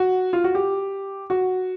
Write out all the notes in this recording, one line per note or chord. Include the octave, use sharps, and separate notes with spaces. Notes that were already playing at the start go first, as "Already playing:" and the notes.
Already playing: F#4
F4
F#4
G4
F#4